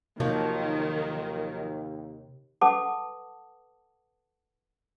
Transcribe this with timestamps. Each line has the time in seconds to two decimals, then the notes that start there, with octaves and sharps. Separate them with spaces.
0.20 D#2 C3 D#3 F3 F#3 A#3
2.61 A4 B4 F#5 A5 D6 D#6